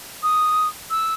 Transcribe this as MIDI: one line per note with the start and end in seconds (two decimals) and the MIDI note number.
0.23 0.68 87
0.90 1.14 88